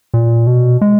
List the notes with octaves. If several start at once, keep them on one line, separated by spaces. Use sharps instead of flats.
A#2
B2
G#3